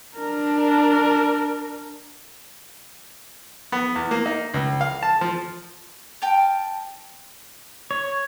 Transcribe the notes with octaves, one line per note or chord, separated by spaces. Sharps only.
D4 A#4
B3
E2
A#3
D#4
C#2
F5
A5
F3
G5 A5 F6
C#5